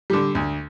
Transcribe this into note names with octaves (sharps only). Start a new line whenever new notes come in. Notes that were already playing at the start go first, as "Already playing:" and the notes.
D3 G3
D2